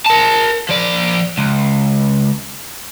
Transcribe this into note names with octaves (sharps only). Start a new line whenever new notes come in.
A#4 A5
F3 D5
C#2